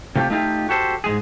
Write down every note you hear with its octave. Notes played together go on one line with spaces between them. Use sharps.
C3 A3 F4 G4
A3 D#4 F4 G4
F#4 G4 A4 C5
G#2 G#3 G#4